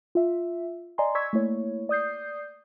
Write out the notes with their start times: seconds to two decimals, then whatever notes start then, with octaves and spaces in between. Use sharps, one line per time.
0.15 F4 E5
0.98 D5 D#5 G#5 A#5 C6
1.15 D5 D#5 C#6 E6 G#6 B6
1.33 A3 A#3 E4 C#5
1.89 D5 D#6 G6 C7